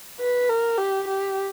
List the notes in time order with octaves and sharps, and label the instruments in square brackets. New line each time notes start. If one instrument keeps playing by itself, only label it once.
[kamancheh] B4
A#4
G4
G4